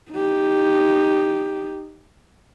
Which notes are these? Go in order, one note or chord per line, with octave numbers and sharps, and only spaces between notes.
D#4 G4